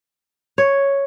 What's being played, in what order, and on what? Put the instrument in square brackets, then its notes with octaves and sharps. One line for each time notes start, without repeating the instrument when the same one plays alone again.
[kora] C#5